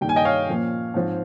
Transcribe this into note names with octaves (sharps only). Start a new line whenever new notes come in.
G2 D#3 A#3 G5
G#5
D#5 G5
C#5 F5
A#2 F3 A#3 C#4
G#2 F3 C4